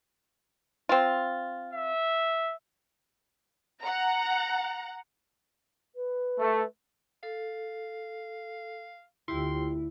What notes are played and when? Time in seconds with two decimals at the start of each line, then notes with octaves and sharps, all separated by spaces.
0.89 C4 F4
1.73 E5
3.82 F#5 A#5
5.95 B4
6.39 A3
7.23 A4 F5
9.28 D2 E4 F4 G4 G5 C6